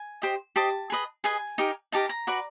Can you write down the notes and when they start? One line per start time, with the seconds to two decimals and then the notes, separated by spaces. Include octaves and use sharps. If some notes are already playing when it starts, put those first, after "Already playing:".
Already playing: G#5
0.22 G4 C5 D#5
0.56 G4 C5 D#5 A5
0.90 G#4 B4 D#5
1.24 G#4 B4 D#5 G#5
1.58 D#4 G4 A#4
1.92 D#4 G4 A#4 A5
2.09 A#5
2.27 F#4 B4 D5